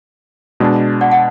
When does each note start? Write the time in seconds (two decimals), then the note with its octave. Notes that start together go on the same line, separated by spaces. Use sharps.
0.60 B2 G#3 D4
1.01 D5 F#5
1.11 F#5